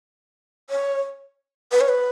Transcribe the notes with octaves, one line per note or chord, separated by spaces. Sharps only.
C#5
B4
C#5
B4